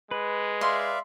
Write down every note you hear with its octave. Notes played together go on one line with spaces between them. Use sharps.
G#3 B4
D5 E5 F5 C6